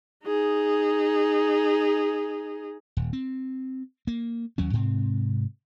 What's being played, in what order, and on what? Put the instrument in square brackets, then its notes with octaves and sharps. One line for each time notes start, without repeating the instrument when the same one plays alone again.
[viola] D#4 G#4
[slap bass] D#1
C4
A#3
D#2 F#3 C#4
G#2 C3 C4